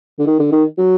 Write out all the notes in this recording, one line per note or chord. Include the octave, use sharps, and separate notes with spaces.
D3
D#3
D3
D#3
F#3